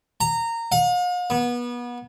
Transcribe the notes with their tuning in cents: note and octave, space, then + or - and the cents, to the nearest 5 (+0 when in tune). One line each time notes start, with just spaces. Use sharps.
A#5 -20
F5 +45
B3 -30